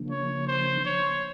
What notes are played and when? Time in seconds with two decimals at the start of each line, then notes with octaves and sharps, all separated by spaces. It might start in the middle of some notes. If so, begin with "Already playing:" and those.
Already playing: C#3 F3 A#3 D4
0.11 C#5
0.47 C5
0.85 C#5